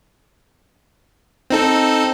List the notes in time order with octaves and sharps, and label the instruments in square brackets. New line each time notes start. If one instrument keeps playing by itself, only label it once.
[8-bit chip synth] C4 D#4 A4